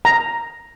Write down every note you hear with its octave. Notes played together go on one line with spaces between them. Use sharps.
A#5